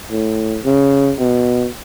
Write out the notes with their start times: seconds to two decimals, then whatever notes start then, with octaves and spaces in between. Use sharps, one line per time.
0.11 A2
0.65 C#3
1.19 B2